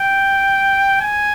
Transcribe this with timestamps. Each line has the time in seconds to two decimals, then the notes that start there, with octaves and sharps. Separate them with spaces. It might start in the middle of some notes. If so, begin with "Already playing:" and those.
Already playing: G5
1.01 G#5